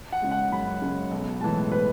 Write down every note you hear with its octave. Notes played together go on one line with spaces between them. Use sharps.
F#5
C#3 G#3
F#5
F#2 B5
C#3 G#3
B1
A2 E3 G#3 A5
B4